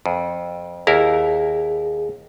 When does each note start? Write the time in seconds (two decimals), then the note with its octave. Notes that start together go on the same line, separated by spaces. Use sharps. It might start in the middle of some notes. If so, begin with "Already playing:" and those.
0.06 F2
0.87 D#2 E4 G#4 A#4